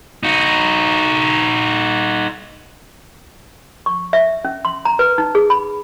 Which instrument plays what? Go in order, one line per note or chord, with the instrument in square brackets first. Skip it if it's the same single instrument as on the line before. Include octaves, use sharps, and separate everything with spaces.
[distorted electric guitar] D#4 F#4
[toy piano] C#6
E5
C#4
C6
A#5
B4
D#4
G#4
B5